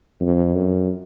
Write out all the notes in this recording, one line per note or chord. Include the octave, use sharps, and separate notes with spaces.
F2
F#2